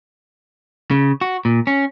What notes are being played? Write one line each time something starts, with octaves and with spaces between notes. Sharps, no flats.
C#3
F#4
A#2
C#4